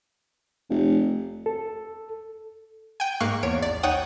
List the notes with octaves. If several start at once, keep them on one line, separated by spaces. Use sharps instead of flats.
F1
A4
G5 G#5
G#2 A#3 F5 C#6 F#6
E2 C#5 D7
A1 D5
D#2 D#4 C#5 F#5 G5 D#6